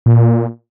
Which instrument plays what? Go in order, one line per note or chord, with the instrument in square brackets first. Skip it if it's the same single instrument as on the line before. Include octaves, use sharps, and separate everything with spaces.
[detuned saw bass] A#2